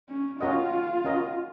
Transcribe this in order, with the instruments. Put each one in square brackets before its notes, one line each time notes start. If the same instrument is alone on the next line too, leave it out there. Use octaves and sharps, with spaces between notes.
[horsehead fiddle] C#4
[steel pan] C#4 F#4 A#4 D#5 [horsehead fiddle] F4
[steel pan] C#4 F#4 A#4 D#5